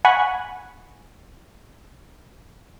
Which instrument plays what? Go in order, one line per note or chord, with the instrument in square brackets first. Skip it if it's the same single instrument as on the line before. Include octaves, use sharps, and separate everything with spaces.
[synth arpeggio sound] F#5 G#5 B5 C#6